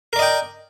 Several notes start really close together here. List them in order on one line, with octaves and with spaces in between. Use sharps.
A#4 D5 D#5 G5